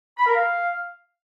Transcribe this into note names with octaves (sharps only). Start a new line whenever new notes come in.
B5
A#4
F5